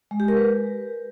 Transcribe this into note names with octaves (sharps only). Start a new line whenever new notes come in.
G#3
G4
A#4
B4